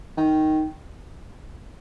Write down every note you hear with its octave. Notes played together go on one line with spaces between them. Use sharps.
D#3